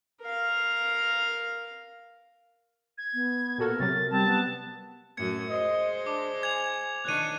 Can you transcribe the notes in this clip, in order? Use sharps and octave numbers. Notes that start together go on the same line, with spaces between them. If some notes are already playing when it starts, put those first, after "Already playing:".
A#4 F5
G#6
B3
A#2 F#4 A4 A#4
C3 F#3 A6
G3 C4 A5
B3
F#2 A2 F#4 G#6 C#7
G#3 C5 D#5
D4 D6
G#5 G#6 F7
D#3 D4 C#5 F#6 D#7